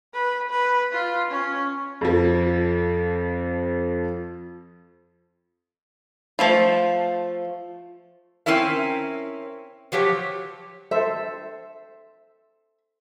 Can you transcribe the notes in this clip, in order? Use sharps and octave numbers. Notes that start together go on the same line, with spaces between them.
B4
B4
F4
C#4
F2 F3
F3 A3 F4
C4 C#4 E4 A#4 E5
F3 F#3 G4 C#5
A4 C5 E5 C6